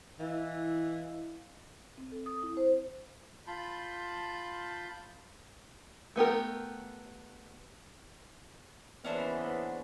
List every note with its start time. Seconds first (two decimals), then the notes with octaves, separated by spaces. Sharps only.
0.19 E3 E4 D#5 F5
1.98 C4
2.12 A4
2.26 D#6
2.43 E4
2.57 C5
3.47 F4 A5 B5 C6 G6
6.16 A3 B3 G4 A#4
9.04 C#3 E3 A#3 B3 C#4 D4 C5